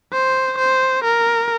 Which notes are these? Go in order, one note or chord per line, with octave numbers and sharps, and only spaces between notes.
C5
C5
A#4